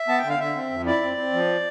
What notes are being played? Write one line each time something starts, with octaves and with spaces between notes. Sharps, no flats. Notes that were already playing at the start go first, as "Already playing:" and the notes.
Already playing: E5
B3 A5
G5
D3
F5
D3 E5
C4
F2
E4 D5
C4
C4
F3